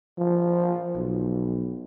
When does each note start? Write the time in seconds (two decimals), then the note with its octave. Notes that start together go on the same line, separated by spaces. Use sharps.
0.18 F3
0.96 B1